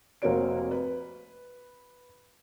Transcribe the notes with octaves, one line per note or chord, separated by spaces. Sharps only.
F1 A#3 C4 F#4 C#5 D7
B4